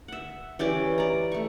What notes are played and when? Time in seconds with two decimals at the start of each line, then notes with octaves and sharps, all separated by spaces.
0.08 E5 F#5
0.59 E3 C#4 G4 D5
0.98 D5 A#5
1.32 A3 C#6